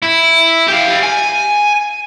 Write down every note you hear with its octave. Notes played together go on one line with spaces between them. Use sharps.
E4
G4 F5
G#5